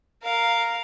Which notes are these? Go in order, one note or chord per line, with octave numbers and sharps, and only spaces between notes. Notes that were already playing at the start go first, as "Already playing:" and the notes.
A#4 F5